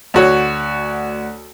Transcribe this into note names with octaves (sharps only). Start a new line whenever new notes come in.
D2 F#4 C#5